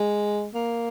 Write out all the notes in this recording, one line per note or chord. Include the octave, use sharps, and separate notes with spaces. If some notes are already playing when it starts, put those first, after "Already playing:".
Already playing: G#3
A#3